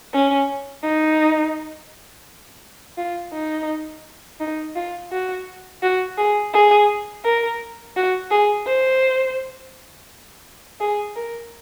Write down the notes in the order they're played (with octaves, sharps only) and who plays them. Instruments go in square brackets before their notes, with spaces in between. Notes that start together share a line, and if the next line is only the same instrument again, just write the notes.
[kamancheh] C#4
D#4
F4
D#4
D#4
F4
F#4
F#4
G#4
G#4
A#4
F#4
G#4
C5
G#4
A#4